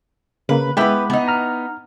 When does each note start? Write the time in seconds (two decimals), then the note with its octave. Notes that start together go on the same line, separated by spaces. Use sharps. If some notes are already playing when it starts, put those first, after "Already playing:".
0.49 C#3 A#3 B4
0.77 G#3 B3 E4 G4 B4
1.10 B3 D#4
1.28 A#5 F6